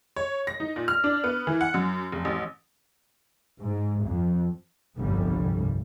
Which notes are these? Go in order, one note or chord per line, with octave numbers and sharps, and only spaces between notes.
C#5
A#6
D#4
A#2
F6
D4
B3
E3
F#5
F#2
F1
A1
G#2
F2
G1 C2 F2 C3 G3